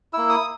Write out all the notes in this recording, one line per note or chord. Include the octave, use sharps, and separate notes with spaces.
A#3 E4 E6
D#6